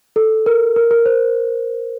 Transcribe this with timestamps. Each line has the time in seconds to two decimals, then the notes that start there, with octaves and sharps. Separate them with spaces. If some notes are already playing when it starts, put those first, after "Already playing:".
0.16 A4
0.46 A#4
0.76 A#4
0.91 A#4
1.06 C5